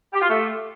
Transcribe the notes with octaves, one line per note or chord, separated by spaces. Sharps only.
G4
F4
A3